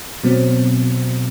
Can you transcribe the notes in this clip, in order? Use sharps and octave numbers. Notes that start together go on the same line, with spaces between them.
B2 F#3 C4